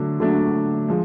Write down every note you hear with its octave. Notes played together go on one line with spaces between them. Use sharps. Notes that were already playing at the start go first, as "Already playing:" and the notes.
Already playing: D3 F#3 A3 D4 F#4
D3 F#3 A3 D4 F#4
F3 G#3